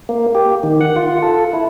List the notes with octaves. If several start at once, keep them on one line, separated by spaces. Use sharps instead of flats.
A#3
G4
D#3
F#5
F4
A4
E4